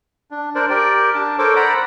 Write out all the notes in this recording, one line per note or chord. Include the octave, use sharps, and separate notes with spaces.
D4
D4 A#4 C5 D5
G4 A#4 D5 G5
D4 A5
A4 A#4 C5 C#5 D6
C5 D5 F#5 A#5 B5